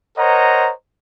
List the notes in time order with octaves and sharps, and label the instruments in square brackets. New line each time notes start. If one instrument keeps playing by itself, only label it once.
[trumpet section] A#4 C5 C#5 D#5 F#5 A#5